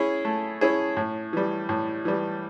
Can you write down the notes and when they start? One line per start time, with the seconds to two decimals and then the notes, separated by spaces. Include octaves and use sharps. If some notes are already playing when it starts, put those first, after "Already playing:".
Already playing: C#4 E4 G#4
0.25 A3
0.61 C#4 E4 G#4
0.97 A2
1.33 E3 G3
1.69 A2
2.05 E3 G3